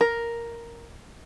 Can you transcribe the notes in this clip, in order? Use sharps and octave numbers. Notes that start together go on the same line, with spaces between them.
A#4